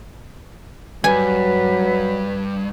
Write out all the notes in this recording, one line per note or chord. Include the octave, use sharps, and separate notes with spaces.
G2 F#3 B4 G#5